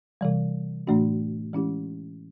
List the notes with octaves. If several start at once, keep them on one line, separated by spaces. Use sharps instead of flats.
C3 E3 G3
A2 E3 A3 D4 F#4
E3 G#3 C#4 E4 G4